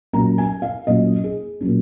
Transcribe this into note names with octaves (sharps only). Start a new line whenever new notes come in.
A#2 F#3 C#4 A#5
G#5
F5
A#2 F#3 C#4 D#5
G#4
A#2 F#3 C#4